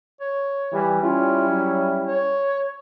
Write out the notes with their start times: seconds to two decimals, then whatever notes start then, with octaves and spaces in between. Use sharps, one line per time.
0.21 C#5
0.72 E3 G3
1.03 G3 C#4 E4 F4
1.47 F#3
2.07 C#5